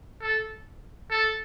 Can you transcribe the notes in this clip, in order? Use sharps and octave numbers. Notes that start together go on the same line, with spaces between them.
A4
A4